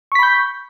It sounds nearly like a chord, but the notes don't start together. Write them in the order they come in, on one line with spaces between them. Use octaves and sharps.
C#6 B6 B5 G6